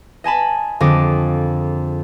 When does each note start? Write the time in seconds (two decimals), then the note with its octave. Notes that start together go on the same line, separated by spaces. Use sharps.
0.24 D#5 G#5 A5 B5
0.80 F2 D3 G#4 D#5 D6